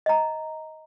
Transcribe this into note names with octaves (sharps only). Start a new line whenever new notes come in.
D#5 A#5